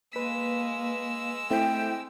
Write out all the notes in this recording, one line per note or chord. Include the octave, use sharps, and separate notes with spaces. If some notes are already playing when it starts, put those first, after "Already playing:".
G#3 A#3 B4 E6 B6
A3 C4 E4 G5